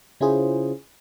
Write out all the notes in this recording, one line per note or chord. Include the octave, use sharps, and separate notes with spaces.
C#3 C#4 E4 F4 G#4 C5